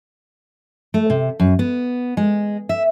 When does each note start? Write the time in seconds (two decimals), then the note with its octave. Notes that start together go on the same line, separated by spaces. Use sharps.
0.94 A3
1.10 C3
1.40 F#2
1.59 B3
2.17 G#3
2.69 E5